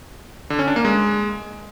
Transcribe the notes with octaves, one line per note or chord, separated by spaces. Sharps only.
D3
C#4
D4
A#3
G#3